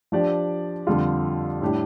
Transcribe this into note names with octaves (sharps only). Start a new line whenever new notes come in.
F3 D4 G4 D5
F2 D3 G3 F4
A2 G3 D4 G4